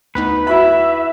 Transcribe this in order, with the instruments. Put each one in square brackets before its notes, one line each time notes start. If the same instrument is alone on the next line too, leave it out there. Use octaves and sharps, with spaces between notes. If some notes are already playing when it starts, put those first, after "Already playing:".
[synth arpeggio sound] D2 B3 D#4 [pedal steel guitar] B4
[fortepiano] E4 F#4 B5 [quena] E5